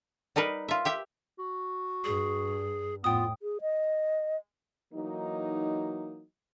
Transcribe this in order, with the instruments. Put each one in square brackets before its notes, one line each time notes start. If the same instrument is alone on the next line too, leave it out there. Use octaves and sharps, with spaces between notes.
[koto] G3 D#4 A#4 B4
F4 E5
G4 E5 G5
[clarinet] F#4
[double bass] G2 [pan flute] G#4
[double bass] F2 A2 [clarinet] B3 [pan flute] F4 [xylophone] G5 D#6
[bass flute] G#4
D#5
[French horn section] E3 F#3 A#3 D#4